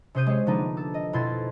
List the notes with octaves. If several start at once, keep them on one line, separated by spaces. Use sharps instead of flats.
C3 C#4 C5 D#6 G6 D#7
G#3 C4 C#5
D3 F3 A#3 B3 D4 D#4
A4
D#5
F2 B2 E4 C6 G#6 A6